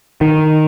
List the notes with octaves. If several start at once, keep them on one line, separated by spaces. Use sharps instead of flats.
D#3